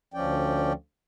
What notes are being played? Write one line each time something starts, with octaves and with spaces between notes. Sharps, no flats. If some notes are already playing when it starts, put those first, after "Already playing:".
D2 F3 C#4 D5 G5